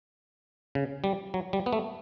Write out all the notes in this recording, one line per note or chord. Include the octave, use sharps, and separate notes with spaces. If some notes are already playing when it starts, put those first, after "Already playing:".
C#3
G3
F#3
G3
B3
A3